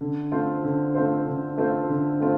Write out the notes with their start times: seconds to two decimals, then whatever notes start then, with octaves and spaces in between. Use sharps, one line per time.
0.01 D3
0.32 A3 C4 F4 C5
0.63 D3
0.95 A3 C4 F4 C5
1.26 D3
1.58 A3 C4 F4 C5
1.89 D3
2.20 A3 C4 F4